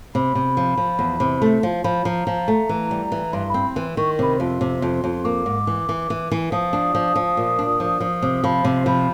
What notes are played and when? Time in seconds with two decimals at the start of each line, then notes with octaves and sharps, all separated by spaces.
0.14 C3 B5
0.35 C3
0.57 F3
0.78 F3
0.99 E2
1.20 C3
1.42 A3 C6
1.63 F3 C6
1.84 F3 B5
2.05 F3 A#5
2.27 F3
2.48 A3
2.69 E3
2.91 G3
3.12 E3
3.33 G2 C6
3.49 B5
3.54 C4
3.76 E3
3.81 C6
3.97 D#3 C#6
4.10 C6
4.19 C3 B5
4.35 F2 C6
4.61 C3
4.82 F2
5.04 F2
5.24 A#3 D6
5.46 G#2
5.67 E3
5.89 E3
6.10 E3
6.32 E3
6.52 F3 D#6
6.73 D4
6.95 F3
7.16 F3
7.37 A#2
7.59 D4
7.80 F3
8.00 F3
8.22 C3
8.44 F3 B5
8.64 C3 C6
8.80 C6
8.86 F3 B5